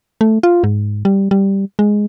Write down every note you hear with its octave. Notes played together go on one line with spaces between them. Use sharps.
A3
F4
G#2
G3
G3
G#3